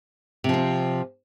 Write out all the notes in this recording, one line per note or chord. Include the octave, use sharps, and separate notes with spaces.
C3 F3 C4